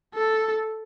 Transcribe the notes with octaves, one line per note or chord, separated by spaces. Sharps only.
A4